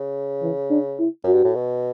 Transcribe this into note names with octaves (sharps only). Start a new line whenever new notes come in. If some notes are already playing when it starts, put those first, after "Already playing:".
Already playing: C#3
E3
D4
E4
F#2 F#4
G2
A2
B2